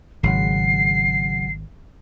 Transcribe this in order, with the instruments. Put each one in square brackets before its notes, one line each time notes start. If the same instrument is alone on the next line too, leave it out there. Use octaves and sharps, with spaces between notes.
[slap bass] G#1 [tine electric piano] C#3 F#3 F#5 [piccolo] C7